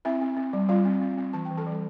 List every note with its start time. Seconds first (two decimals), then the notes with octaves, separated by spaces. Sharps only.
0.05 C4 E4 E5
0.22 C4
0.37 C4
0.53 G3
0.69 G3 F4 F5
0.85 C4
1.02 C4
1.18 C4
1.33 E3 A5
1.45 G5
1.51 E3
1.57 A4 A5
1.66 G3